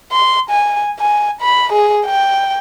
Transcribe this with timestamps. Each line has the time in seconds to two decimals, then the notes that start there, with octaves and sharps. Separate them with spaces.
0.12 C6
0.50 G#5
1.00 G#5
1.41 B5
1.72 G#4
2.06 G5